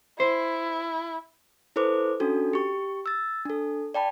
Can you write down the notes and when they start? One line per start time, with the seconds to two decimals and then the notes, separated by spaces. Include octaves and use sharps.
0.20 E4 C5
1.76 E4 A4 B4 C5 D6
2.20 C#4 D4 F#4 A4
2.53 G4 C#6
3.06 E6 A6
3.45 D4 A4
3.94 D5 G5 A5 B5